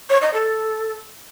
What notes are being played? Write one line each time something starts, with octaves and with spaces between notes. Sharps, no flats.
C#5
D#5
A4